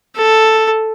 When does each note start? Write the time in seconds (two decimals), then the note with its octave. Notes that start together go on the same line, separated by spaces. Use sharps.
0.17 A4